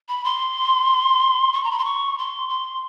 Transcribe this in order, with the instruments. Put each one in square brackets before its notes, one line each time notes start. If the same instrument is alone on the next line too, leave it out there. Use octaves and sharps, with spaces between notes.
[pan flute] B5
C6
C#6
A#5
B5
C6
C#6
C6
C6